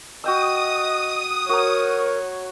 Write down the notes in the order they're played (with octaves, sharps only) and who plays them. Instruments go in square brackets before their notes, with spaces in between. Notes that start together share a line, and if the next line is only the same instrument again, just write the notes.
[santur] F#4 G5 E6 [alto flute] D#5 [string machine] D#6
[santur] F#4 A#5 [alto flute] A#4 [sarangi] C#5